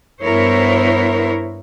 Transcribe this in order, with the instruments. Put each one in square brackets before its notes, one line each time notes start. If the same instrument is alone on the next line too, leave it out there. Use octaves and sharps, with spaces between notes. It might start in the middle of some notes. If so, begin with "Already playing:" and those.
[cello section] G2 B3 E4 A#4 C5 C#5